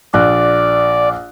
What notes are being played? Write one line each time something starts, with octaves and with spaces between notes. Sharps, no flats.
A#1 D5 F#6